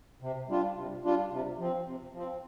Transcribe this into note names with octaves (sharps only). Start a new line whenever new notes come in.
C3
G3 D4 F4
C3
G3 D4 F4
C3
F3 C4
C3
F3 C4